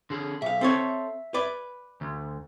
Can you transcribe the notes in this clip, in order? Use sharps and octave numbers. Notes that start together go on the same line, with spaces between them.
D3 G#4
B1 E5 F5
C4 A4 C#5
B4 D5
D2